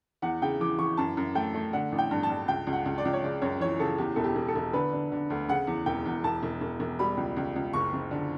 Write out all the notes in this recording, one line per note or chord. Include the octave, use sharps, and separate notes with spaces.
E2 F#5
C#3 G5
E3 D6
E3 C#6
F#2 A5
F#2
A3 G5
A3
D3 F#5
A1
G5
G2
A5
G2
C#2 G5
C#2
F#5
C#2
D5
C#2
C#5
C#3 D5
F#2 C#5
E3 C#5
C#3 A4
E2 G4
E1 A4
G4
E1
A4
E1
D3 B4
D3
D3
D2
C#3 F#5
E2
E1 G5
E2
E1 A5
E1
E1
E1
G3 B5
C#2
C#2
C#2
F#1 C#6
F#1
D3